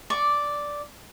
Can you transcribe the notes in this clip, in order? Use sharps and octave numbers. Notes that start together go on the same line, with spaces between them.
D5 C#6